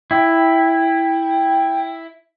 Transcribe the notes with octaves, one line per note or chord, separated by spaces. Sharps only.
E4 G5